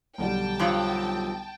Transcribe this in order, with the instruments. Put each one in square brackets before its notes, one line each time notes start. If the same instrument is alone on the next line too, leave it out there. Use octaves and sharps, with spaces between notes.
[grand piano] B1 D3 G3 [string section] G5 A5
[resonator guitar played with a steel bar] G2 F3 F#3